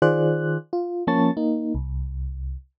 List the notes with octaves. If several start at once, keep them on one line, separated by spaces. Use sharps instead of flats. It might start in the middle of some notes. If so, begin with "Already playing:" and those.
D#3 F4 G#4 C5 D5 F#6
F4
F3 A#3 C#4 A5 C#6 A6
A#3 D#4
C2